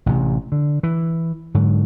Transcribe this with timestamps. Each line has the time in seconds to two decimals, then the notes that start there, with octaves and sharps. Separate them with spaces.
0.06 A1 C3
0.52 D3
0.83 E3
1.54 G#2 D3 F#3